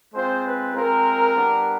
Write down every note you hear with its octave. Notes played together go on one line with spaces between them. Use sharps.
G#3 C4 F4 C5
B4
G#3 C4 F4 A#4
G3 B3 D4 G4